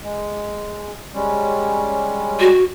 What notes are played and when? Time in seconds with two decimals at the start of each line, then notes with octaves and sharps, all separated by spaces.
0.03 G#3
1.14 G3 G#3 C#4
2.40 F#4